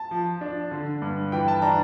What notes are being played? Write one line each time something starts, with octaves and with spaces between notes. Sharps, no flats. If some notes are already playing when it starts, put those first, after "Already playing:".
Already playing: A5
F3
D4
D3
G2
E3 G5
A5
D4 A#5